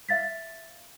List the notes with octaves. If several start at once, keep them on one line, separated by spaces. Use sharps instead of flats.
E5 F5 A6 B6